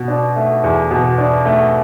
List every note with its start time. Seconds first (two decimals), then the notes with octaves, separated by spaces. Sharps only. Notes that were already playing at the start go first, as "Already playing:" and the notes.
Already playing: B2
0.08 D4
0.36 A3
0.63 E2
0.91 B2
1.18 D4
1.45 A3